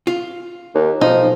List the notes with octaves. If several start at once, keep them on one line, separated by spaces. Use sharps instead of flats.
F4
D#2
B1 F3 D#4